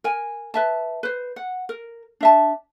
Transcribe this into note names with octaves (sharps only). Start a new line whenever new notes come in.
A#4 G#5
B4 E5 A5
B4 C5
F#5
A#4
D4 E5 A5